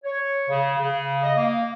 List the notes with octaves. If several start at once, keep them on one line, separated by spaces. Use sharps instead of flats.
C#5
C#3
C#3
D#5
A#3